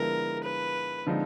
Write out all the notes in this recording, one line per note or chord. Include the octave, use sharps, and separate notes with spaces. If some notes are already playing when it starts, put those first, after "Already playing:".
Already playing: D3 F3 G#3 B3 E4 A#4
B4
D3 F3 G#3 C4 D#4